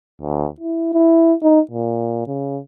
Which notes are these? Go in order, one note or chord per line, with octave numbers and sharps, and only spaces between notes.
D2
E4
E4
D#4
A#2
C#3